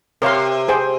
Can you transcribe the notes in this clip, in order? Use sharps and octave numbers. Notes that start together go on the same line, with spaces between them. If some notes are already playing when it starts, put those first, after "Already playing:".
C3 A#4 C#5 F5 C6
G#4 C5 G5